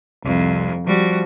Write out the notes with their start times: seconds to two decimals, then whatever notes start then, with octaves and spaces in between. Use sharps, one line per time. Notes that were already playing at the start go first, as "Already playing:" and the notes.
0.24 C2 F2
0.87 F3 G3 F#4